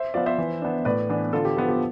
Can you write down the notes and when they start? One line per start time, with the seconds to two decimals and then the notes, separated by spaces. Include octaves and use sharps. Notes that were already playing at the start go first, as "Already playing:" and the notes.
Already playing: C5 E5
0.14 F3 B3 D5 F5
0.26 C5 E5
0.38 E3
0.62 B3 D4
0.85 A2 B4 D5
1.09 E3 B3 D4
1.33 D3 F4 A4
1.45 G4
1.57 F3 B3 F4
1.69 G4